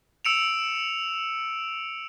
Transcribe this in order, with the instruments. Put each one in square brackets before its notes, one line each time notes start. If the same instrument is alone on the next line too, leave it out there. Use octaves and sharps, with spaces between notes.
[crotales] E6 C#7 D7 E7 F7